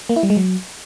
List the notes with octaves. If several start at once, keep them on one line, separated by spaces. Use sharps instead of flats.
A#3
E4
G3
G#3
F#3